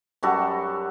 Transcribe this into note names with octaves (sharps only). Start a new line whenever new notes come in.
F#2 G3 F#4 A4